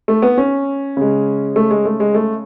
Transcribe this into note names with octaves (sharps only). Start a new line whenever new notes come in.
A3
B3
C#4
C#3 G#3
A3
G#3
A3
G#3
A3